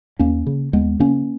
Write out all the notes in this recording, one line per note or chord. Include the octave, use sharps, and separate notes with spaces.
D#2 A#3 C#4
C#3
D#2 G#3 B3
C#3 A#3 C#4